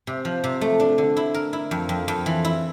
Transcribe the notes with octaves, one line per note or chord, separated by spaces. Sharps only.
C3
F3
C3
A3
D4
D3
E4
A#4
E4
F2
F2
F2
E3
E4